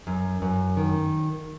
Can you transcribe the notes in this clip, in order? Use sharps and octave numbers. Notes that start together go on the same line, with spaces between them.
F#2
F#2
D#3